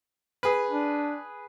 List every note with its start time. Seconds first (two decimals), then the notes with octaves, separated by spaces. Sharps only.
0.43 G#4 B4
0.70 D4